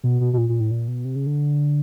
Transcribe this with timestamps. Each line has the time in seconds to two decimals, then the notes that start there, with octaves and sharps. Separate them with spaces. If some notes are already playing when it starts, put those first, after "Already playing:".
0.04 B2
0.21 B2
0.33 B2
0.38 A#2
0.49 A#2
0.60 A2
0.71 A#2
0.88 B2
1.05 C3
1.16 C#3
1.27 D3